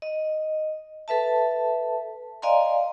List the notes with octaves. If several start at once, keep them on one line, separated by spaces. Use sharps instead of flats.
D#5
A4 B4 E5 A5
D5 D#5 F5 G#5 A#5 C6